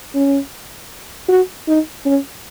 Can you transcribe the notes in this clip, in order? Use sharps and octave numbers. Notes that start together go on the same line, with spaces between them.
C#4
F#4
D#4
C#4